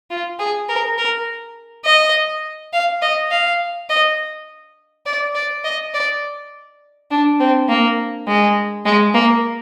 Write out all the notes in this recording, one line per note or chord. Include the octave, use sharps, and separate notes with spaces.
F4
G#4
A#4
A#4
D#5
F5
D#5
F5
D#5
D5
D5
D#5
D5
D4
C4
A#3
G#3
G#3
A#3